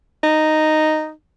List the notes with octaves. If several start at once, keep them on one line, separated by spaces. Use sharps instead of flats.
D#4